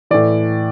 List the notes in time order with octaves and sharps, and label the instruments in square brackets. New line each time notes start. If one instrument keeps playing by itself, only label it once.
[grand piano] A2 E3 D5